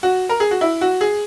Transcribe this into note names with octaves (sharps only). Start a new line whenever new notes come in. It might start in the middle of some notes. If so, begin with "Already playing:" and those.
F#4
A#4
G#4
F#4
E4
F#4
G#4